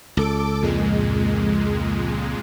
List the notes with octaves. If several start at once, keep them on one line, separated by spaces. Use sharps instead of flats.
C#2 A4 D6 D7
F2 A#2 G#3